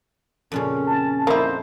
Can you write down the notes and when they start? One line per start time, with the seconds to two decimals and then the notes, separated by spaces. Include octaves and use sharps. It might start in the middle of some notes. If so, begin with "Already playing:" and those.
0.52 F2 A#2 C#3 C#4
0.87 A5
1.27 F2 A#3 D#4 E4 C5